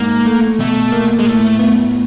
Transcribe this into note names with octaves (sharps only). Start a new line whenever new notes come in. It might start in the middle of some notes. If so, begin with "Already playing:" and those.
Already playing: G#2 A#3
A3
B2 A3
A#3
G#3
A2 A3
B3